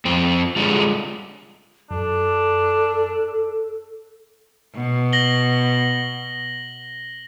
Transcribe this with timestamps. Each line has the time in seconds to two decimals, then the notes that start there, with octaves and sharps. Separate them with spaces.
0.05 F2 C4
0.56 D3 G3 G#3 F4
1.91 F#2 D4 A4
4.75 B2
5.13 A#6 F#7 G7